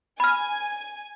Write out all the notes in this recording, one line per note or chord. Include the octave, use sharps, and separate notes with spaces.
G#5 B5 F6